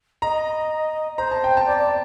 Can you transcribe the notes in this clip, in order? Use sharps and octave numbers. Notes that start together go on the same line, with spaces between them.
D#5 A#5
C5 A#5
A5
G5
A5
D5
D5